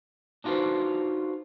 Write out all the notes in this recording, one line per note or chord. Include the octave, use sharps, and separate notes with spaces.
D4 D#4 F4 F#4 B4 C5